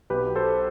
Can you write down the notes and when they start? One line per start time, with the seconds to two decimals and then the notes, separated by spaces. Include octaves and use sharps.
0.10 B1 B2 G4 B4
0.36 A4 C5